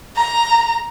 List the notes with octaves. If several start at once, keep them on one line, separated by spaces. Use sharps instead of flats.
A#5